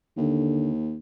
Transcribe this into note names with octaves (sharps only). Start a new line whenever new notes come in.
D#2 D3